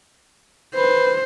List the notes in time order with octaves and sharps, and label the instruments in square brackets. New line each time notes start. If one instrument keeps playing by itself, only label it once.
[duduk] B4 [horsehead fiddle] C5